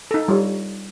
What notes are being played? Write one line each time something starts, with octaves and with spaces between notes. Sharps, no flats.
D#4 A4
G3 F4 C#5